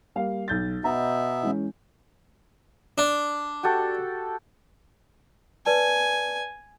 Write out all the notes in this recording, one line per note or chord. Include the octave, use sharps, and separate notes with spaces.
G3 A#3 F5
B1 G6 A6
B2 B3 D#5 E5 A#5
E3 G#3 C#4
D4
F#4 G4 A4
B4 D5 G#5 A5